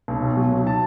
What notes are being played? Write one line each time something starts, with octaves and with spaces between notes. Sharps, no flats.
B1
B2
F#3
B1
A5